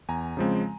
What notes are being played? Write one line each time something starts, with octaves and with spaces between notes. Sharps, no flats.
E2 G#5 A#5
C#3 F3 G#3 C4